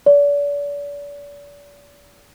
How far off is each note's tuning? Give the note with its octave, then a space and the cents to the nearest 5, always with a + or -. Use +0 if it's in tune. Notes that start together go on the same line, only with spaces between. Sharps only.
D5 -40